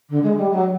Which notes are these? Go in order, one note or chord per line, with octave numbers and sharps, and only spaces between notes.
D3
G#3
G3
F#3